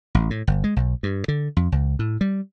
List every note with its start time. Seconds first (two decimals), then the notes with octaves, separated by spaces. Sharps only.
0.15 A1
0.30 A2
0.47 G1
0.64 G#3
0.76 B1
1.03 G2
1.28 D3
1.57 F2
1.72 C#2
1.99 A2
2.21 G3